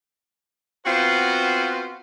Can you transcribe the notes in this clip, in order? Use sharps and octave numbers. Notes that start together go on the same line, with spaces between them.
B3 C4 F4 F#4 B4 C5